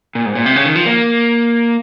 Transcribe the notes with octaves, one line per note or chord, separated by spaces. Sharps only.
A#2
G#2
A#2
C3
C#3
D#3
F3
A#3